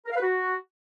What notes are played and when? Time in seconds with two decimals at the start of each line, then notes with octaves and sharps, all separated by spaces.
0.06 A#4
0.11 F5
0.16 B4
0.21 F#4